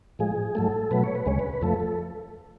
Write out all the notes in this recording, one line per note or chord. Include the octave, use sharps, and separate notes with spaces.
A2 F3 G#3 G#4
G#2 F#3 A3 A4
B2 F#3 A3 B4
C#5
B4
D2 C#3 G#3 C#5
B4
B4
F2 F3 A3 A4
A4